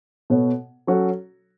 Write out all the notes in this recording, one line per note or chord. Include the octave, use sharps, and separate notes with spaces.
B2 B3 A4 C#5
F#3 C#4 F#4 A4 C#5